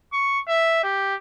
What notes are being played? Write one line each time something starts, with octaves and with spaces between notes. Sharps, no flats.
C#6
E5
G4